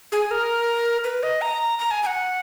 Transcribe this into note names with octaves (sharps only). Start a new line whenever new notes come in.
G#4
A#4
B4
D#5
A#5
A#5
G#5
G#5
F#5